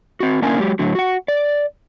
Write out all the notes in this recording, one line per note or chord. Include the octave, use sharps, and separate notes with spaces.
C4 F#4
A#3 C#4 D4 E4 A#4 G#5
F#3 G#3 G4
A2 D3 F#3
F#4 F#5
D5